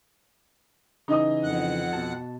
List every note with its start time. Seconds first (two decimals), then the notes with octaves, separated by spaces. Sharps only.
1.08 C#3 E3 D#4 D#5 D#6
1.43 F2 F#5
1.93 B2 A5